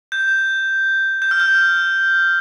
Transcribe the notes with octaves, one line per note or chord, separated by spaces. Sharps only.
G6
G6
F6
G6